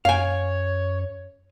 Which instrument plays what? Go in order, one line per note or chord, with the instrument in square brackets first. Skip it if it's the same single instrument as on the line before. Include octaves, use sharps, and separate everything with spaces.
[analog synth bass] F#2 [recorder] C#5 [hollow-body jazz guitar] F5 G#5